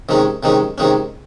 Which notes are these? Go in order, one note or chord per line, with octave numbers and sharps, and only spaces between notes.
C3 D#3 G#3 C#4
C3 D#3 G#3 C#4
C3 D#3 G#3 C#4